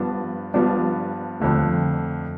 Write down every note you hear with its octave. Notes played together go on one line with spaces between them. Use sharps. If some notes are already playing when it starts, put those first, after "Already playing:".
Already playing: G2 F3 B3 D4
G2 F3 B3 D4
F2 D3 A3